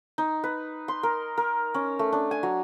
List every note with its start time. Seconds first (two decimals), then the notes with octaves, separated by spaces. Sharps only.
0.18 D#4
0.43 B4
0.88 C6
1.03 A#4
1.38 A#4
1.74 C#4
1.99 A3
2.13 D4
2.31 G#5
2.43 F#3